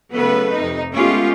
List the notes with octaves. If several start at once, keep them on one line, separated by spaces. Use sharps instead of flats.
C#3 F#3 A3 B3 A4 B4
F2 C3 D#4
G#3 A3 B3 C#4 F4 G4